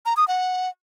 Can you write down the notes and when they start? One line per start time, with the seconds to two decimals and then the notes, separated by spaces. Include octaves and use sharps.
0.06 A#5
0.17 D#6
0.28 F#5